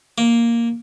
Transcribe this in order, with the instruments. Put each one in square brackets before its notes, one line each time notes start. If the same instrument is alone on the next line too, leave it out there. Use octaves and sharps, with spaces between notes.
[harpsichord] A#3